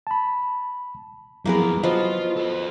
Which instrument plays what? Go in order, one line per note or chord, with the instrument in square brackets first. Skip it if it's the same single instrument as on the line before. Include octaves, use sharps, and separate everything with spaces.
[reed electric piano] A5 B5
[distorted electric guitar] E2 F3 [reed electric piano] F#3 E4 G#4 [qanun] A#3 B3 A#4
[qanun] F3 B3 F#4 [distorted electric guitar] F4 [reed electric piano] D#5
[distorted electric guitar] A4 C5